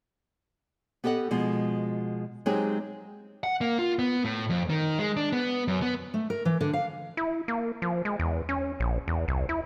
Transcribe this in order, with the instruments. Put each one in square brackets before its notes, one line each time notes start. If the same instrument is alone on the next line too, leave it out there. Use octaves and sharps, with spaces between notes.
[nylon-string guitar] B3 G4 A4 D#5 F#5
B2 F3 G#3
F#3 G#3 C4 D#4 G4 G#4
[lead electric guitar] F#5
A#3
F4
B3
A2
F2
D#3
G#3
D4
B3
F#2
B3
[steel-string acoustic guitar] A3
A#4
E3
D3
F5
[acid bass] E4
A#3
F3
G#3
E2
C#4
A#1
E2
C2
E4